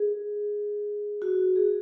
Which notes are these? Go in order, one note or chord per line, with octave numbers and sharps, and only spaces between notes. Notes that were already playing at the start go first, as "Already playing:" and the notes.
Already playing: G#4
F#4
G#4